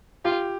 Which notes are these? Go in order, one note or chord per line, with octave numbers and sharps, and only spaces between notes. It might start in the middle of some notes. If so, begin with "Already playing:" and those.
F4 G4